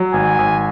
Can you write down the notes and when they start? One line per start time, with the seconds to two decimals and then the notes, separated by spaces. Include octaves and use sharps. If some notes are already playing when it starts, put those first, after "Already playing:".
Already playing: F#3
0.14 G#1 G#5
0.39 G#1